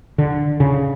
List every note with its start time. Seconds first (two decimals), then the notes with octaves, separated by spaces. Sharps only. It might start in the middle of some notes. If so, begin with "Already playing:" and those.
0.18 D3
0.60 C#3